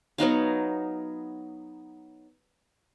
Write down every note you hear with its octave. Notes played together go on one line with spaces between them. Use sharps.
F#3 B3 D#4 F5